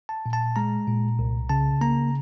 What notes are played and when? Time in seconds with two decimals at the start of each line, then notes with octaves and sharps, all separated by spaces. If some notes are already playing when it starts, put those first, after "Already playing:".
0.09 A5
0.26 A#2
0.33 A5
0.56 G#3 A#5
0.87 A#2
1.19 C2
1.49 C#3 A5
1.81 A#3 A#5